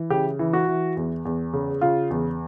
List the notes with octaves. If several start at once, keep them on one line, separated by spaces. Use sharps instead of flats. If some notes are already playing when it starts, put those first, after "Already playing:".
Already playing: E3
C#3 G4
E3
F#4
E3
E2
E2
C#3
C#3 F4
E2